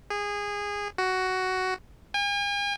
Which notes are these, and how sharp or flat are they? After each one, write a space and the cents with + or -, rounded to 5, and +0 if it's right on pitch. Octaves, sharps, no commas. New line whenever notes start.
G#4 -20
F#4 +10
G#5 -45